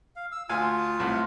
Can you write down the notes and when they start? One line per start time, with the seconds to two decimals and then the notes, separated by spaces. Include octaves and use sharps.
0.16 F5
0.32 E6
0.49 D2 F4 F5 G#5
1.00 C2 A2